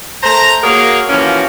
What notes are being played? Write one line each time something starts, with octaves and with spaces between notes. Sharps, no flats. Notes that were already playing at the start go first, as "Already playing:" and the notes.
A3 A#4 C5 A#5
A#3 F#4 G#4 A#4 C#5 F5
E3 F3 A#3 C#4 F#4 A#4